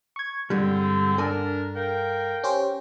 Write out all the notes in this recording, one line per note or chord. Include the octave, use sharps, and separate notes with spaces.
C#6 G#6
G2 D3 G3 G#3 C4
D4 A4 A#4 D5 G#5
A#4 F5 G5
C#4 G4 C5